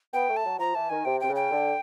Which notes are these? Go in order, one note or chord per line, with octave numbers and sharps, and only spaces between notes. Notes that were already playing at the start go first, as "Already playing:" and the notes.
B3 G5
A3
A5
F#3
F3 A#5
E3 A5
D#3 G#5
C3 G5
C3 G5
C#3
G5
D3